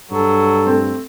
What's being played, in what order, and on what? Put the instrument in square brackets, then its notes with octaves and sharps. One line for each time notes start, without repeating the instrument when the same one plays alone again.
[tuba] G2 [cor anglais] F#3 [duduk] A4
[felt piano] A3 C4